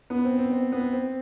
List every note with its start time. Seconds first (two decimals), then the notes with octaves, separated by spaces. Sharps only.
0.10 B3
0.25 C4
0.39 C4
0.52 C4
0.72 B3
0.93 C4